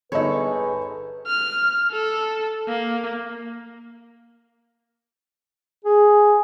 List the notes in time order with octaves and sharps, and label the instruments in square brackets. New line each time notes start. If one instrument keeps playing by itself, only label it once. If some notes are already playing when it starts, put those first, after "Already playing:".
[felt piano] G1 D#4 [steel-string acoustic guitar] G#4 A4 [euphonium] B4 [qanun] C#5
[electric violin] F6
A4
A#3
[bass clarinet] G#4